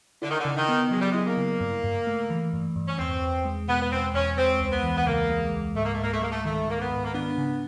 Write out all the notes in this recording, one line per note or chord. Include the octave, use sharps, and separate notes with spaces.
D3 E4
D#3
D3
C#3
D#3
B3
F#3 G#3
G3
G#3 E4
A#3
C#3
G2
G2
A3
E3
G2
G2
C#4
E2 C4
E2
G#3
B2 B3
B3
E2 C4
E2 C#4
G#3 C4
C#2
B3
E3
B3
C#3 A#3
G#3
C#2
G#2 A3
A#3
A3
G#2 A#3
A3
G#3 A#3
A3
D#3 A3
G#2 A#3
B3
G#2
A#3
B3 D4
C#3